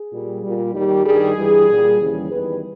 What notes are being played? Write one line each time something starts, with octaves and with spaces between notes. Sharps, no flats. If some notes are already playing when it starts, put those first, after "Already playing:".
Already playing: G#4
A#2 G3
A#2 G3
D#2 D#3 G3 G4
G2 D#3 G3 G#4
G2 E3 G3
A#2 G3
D#2 C#3 E3 G3
E2 D#3 G3 B4